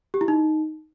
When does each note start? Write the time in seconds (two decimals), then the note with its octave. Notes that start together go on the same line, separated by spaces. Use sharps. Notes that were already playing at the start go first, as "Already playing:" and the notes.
0.14 G4
0.21 E4
0.28 D#4